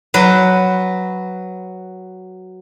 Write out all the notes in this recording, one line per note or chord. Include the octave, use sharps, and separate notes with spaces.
F#3 B4